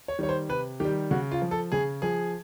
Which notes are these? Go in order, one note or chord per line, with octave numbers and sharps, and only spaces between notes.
C#5
D#3 G3 C#5
C5
C3 B4
D#3 G4
G3
C#3 F#4
F4
F3
A4
C#3 G#4
F3 G#4